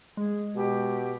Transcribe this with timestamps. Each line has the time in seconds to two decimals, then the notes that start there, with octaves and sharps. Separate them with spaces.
0.17 G#3 G#4
0.55 B2 G4